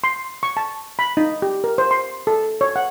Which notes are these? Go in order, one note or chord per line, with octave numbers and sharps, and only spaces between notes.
C6
C#6
A5
B5
D#4
G4
A#4
C5
C6
A4
C#5
F#5